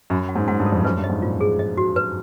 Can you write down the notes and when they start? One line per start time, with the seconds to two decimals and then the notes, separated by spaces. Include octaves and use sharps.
0.10 F#2 B5
0.29 F#5
0.35 G#2
0.48 G#2 F#5
0.60 G2
0.66 A4
0.72 F2
0.84 F#2 B4
0.97 G2
1.04 D#5
1.10 G#2
1.22 A#2 F4
1.41 G#4
1.59 D#5
1.78 F#4
1.96 B4